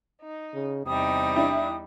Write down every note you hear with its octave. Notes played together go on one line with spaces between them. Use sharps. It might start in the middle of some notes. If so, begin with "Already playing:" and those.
D#4
C#3
E2 C3 G3 D#4 G5 D#6
D4 E4